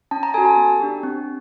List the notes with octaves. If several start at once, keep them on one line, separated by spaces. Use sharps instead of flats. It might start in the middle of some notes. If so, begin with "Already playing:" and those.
C#4 A5
A#5
F#4 A4 G#5
A5
B3
D4 G4
C4